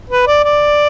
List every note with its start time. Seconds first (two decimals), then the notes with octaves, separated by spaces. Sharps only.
0.10 B4
0.27 D5
0.44 D5